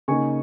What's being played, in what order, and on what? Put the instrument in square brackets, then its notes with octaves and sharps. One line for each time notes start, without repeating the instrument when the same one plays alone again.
[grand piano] C#3 A#3 D#4 G#5 C#6